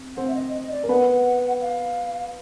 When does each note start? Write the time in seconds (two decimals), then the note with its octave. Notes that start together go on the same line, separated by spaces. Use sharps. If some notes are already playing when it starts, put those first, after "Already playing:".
Already playing: C4
0.17 C4 C5 F#5
0.28 E5
0.35 D#5
0.54 D#5
0.71 D5
0.83 A#4
0.88 B3 B4 F#5
1.61 F5